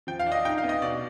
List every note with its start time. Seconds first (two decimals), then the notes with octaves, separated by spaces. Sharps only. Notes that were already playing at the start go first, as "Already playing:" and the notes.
0.07 F3 G5
0.19 F5
0.26 D4
0.32 D#5
0.45 D#4 G5
0.58 F5
0.63 B3
0.69 D#5
0.82 B2 D5